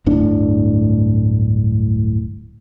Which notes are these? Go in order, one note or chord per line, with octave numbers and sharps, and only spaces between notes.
D1 G1 A2 D4